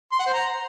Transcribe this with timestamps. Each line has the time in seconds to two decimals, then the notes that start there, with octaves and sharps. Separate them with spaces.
0.12 C6
0.19 F#5
0.26 C5
0.34 A#5